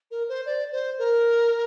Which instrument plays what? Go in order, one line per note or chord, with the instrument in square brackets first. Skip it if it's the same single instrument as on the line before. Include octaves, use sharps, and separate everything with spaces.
[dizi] A#4
C5
D5
C5
A#4